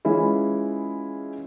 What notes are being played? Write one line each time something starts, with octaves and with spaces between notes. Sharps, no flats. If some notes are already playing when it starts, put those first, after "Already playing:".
E3 G#3 C#4 E4 F4